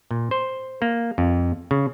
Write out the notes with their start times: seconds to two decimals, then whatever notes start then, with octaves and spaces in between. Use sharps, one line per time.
0.11 A#2
0.31 C5
0.82 A#3
1.18 F2
1.71 C#3